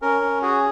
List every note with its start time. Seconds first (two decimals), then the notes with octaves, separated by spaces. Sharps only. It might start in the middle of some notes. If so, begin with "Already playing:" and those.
0.02 C#4 A#4
0.22 C#4
0.42 F#4 G#4